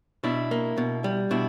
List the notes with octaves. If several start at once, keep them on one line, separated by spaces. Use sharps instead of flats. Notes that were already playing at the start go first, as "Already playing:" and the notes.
B2 D4 E4
A#3
B2
G3
B2 D4 E4